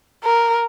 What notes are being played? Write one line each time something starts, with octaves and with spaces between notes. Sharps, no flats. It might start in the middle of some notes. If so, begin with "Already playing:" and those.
A#4